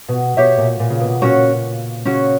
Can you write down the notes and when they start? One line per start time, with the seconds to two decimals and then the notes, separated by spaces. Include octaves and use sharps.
0.08 B2
0.37 B2 G4 C#5 E5
0.57 A#2
0.80 A#2
0.90 C#3
1.00 B2
1.22 A#2 C#4 F#4 C#5
2.05 C#3 C#4 F#4 C#5